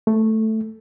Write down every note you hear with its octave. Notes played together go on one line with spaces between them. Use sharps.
A3